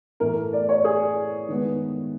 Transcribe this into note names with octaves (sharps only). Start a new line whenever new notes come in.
A2 E3 A3 A#4
D5
C#5
G#4
D#3 G#3 B3